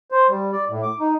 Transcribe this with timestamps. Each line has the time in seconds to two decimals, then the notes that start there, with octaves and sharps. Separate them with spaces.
0.12 C5
0.29 G3
0.52 D5
0.69 A2
0.83 D6
1.00 D#4